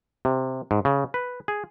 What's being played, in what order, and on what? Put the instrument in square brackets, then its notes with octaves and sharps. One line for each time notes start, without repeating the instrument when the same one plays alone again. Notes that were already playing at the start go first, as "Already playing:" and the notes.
[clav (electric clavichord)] C3
G#2
C#3
B4
G#4